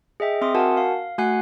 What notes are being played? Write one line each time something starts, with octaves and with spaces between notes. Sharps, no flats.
G#4 D#5 E5 G5
C4 E5 C6 D#6
F#4 A#4 F#5 G#5 A5
F5
A3 F#4 F#5 G#5 F#6 C7